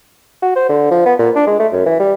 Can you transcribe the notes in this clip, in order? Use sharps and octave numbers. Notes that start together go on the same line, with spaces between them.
F#4
C5
D3
F3
B3
A#2
D4
G#3
A3
F#2
E3
G3